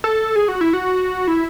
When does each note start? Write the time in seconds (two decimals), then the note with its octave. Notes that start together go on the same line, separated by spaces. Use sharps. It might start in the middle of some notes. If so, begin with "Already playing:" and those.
0.04 A4
0.36 G#4
0.48 F#4
0.61 E4
0.73 F#4
1.28 E4